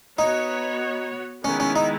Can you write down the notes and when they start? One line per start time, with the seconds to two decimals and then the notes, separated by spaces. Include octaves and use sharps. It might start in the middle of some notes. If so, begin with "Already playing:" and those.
0.19 B3 D#4 F#4 C#5
1.44 D#3 G#3 B3 C#4 E4
1.60 C#4
1.76 D#4